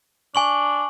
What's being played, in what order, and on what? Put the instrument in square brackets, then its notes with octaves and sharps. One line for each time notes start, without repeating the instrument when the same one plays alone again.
[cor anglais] D4 [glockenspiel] G#5 C#6 F#7